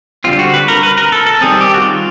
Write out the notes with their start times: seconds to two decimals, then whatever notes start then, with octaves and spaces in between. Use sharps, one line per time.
0.24 D3 G3 C4 F4
0.39 F#4
0.54 B4
0.68 A#4
0.83 B4
0.98 A#4
1.12 A4
1.26 A4
1.41 D#3 G3 C4 G#4
1.61 G4
1.74 F#4
1.81 F4